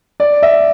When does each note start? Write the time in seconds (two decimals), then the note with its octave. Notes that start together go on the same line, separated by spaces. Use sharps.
0.20 D5
0.43 E5